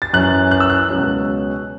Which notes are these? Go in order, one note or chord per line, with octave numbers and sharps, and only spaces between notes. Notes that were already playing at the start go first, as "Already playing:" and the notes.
A6
F#2 E3 C#4 F#6
F#6
E6
F#6
C#2 B2 F#3 C#4